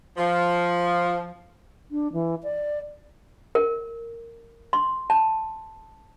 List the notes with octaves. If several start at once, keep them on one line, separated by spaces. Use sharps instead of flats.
F3
D4
E3
D5
A#4
C6
A5